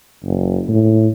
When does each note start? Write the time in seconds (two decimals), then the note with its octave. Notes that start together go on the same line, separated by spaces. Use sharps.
0.24 F#1
0.68 A2